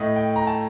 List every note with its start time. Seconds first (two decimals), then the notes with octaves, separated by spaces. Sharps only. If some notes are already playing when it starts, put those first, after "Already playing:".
Already playing: A2 A3 D#5
0.16 G5
0.36 A#5
0.47 A5